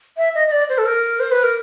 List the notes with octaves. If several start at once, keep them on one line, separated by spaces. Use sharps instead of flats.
E5
D#5
D#5
D5
C5
A4
A#4
C5
B4
A#4